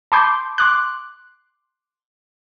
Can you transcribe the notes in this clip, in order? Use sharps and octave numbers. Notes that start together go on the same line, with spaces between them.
A5 B5 C6 D6 G6
C6 D6 F#6